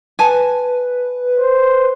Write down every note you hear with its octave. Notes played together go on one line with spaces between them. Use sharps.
B4 G#5 A5
C5